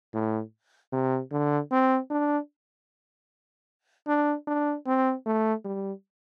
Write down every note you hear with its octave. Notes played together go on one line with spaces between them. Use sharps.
A2
C3
D3
C4
D4
D4
D4
C4
A3
G3